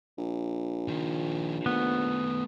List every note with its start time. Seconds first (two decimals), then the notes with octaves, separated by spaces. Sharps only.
0.18 A#1
0.88 D#3 F3
1.66 D#3 A3 B3